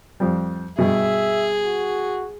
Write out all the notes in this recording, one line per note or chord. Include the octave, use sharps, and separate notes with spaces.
F2 F3 G3
G2 B2 G#4 E5
F#4